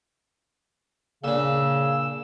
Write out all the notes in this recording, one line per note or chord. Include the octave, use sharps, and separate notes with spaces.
A#2 C#3 D4 E6